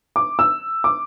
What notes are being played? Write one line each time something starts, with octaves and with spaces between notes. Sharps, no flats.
D6
E6
D6